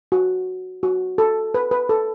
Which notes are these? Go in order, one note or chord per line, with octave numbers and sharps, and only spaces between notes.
F#4
F#4
A4
B4
B4
A4